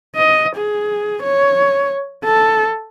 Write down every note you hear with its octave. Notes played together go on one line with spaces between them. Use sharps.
D#5
G#4
C#5
A4